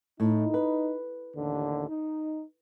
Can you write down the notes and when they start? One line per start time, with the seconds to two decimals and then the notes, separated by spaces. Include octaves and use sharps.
0.20 A2 D#4
0.54 B4
1.36 A1 D#2 D3
1.89 D#4